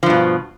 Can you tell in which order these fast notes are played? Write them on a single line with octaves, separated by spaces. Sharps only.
F3 G2 B2